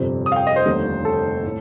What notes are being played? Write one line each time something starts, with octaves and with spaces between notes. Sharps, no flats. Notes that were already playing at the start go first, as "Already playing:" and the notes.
Already playing: G1 F2 C3 G3
D#6
F5
G5
D#5
C5
F1 D#2 D3 G3
A4
A2